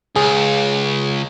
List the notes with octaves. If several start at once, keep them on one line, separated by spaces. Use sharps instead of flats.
C#2 G#4